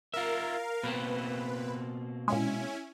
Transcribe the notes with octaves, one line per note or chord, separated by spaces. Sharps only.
F4 A#4 E5 F5
B2 A#3 C4 B4
A#2 G#3 C#4 E4 G#5